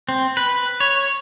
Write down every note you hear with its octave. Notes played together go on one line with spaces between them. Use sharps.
C4
B4
C#5